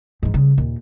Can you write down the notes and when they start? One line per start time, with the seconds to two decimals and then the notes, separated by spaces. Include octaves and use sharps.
0.23 G#2 E3
0.34 C#3 G3
0.58 D#2 A#2